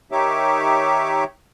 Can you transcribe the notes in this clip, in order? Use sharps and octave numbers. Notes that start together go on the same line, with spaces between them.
D#3 D#4 G4 C#5 E5 D6